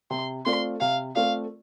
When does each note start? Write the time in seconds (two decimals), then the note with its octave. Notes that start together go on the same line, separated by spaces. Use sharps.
0.10 C3 C6
0.45 A3 C4 F4 D5 C6
0.80 C3 F5
1.15 A3 C4 F4 D5 F5